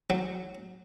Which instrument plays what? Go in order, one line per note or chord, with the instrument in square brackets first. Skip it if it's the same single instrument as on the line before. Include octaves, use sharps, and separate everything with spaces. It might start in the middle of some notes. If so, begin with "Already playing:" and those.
[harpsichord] F#3